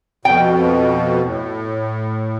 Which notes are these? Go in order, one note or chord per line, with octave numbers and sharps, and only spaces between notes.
F2 B2 G5
A2